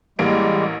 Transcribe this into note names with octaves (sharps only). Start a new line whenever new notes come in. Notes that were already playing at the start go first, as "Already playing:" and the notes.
A1 G3 G#3 A#3 D7